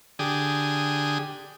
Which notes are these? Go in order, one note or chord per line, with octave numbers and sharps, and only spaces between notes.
D3 G4 G#4 D#6